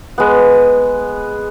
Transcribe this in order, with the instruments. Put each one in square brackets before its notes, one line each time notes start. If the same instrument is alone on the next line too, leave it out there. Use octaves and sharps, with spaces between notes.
[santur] G#3 B3